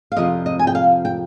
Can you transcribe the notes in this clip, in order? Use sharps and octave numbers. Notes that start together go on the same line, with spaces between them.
F5
F2 C3 F3 D#5
D#5
G#5
G5
F5
G5